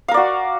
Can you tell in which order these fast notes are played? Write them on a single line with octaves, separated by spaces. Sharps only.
F5 A#4 D5 F#4